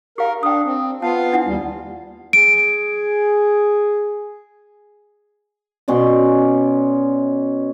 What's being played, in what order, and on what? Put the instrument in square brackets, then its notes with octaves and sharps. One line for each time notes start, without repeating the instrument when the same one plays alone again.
[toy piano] G4 F5 [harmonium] A#4
[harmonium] D4 [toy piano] G5 D#6
[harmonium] C4
[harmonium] B3 F4 F5 [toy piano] A5
[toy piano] D4 E4 F#5
[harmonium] D#2 G3
[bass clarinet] G#4 [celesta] D7
[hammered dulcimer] B2 C#4 D5 C6